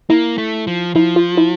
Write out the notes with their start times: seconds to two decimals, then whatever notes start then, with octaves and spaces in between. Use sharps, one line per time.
0.10 A#3 E4
0.38 A3
0.67 F3
0.95 F3 E4
1.16 F4
1.37 E4